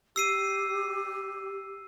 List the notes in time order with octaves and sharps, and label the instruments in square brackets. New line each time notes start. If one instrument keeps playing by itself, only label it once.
[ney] G4 [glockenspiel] E6 C7 D#7